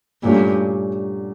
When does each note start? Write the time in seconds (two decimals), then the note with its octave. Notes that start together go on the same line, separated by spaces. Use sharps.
0.23 G2 A#2 F#3 A3 C#4